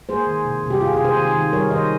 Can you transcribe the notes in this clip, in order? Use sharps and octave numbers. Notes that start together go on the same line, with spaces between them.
A#3 G#4 C5
D#3
C3
C3
G4
C3 F4 G#4
F4 G#4
C3
G#4 C5
D#3
D#3
G3 A#4 C#5
D#3 C5 D#5